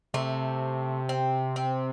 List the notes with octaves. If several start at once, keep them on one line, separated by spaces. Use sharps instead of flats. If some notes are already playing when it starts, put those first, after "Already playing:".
C3 A3
C4
C4